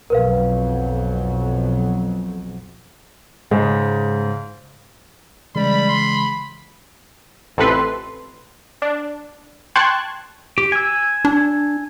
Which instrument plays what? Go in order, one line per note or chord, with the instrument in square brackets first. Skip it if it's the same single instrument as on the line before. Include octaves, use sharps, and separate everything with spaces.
[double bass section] B1 F2 F#3 [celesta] A#4 B4 F5
[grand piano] G#2 C#3 [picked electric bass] G#3
[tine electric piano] C#3 E3 G#3 [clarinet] G3 [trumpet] B5
[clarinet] C6
[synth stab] A1 F2 C3 A4 B4 C6
D4
G5 A5 C6 C#6 F#6 G#6
[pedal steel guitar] G4
G#5 E6
[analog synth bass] D4